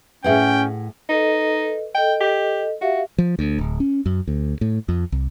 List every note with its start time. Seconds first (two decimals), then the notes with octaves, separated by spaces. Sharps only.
0.24 A2 C#4 G#4 B4 E5 F#5 G5
1.09 D#4 A4 B4 D#5
1.94 A4 D#5 G5
2.20 G4
2.81 F#4 G4 E5 F5
3.18 F3
3.39 D2
3.58 D1
3.80 C#4
4.06 F#2
4.28 D2
4.61 A2
4.89 F2
5.12 C2